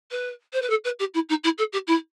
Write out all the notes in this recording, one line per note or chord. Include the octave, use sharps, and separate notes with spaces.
B4
C5
B4
A4
B4
G4
E4
D#4
E4
A4
G4
E4